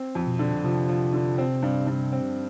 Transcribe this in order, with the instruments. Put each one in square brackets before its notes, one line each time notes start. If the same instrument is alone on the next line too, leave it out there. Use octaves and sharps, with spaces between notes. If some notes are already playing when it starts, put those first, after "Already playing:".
Already playing: [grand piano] C4
F2
[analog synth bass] B2
[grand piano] D3
[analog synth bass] C3 [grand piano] F3
[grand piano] F3
D3
C4
G2
G2
C4